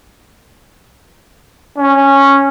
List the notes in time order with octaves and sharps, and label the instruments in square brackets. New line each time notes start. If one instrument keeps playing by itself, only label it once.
[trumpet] C#4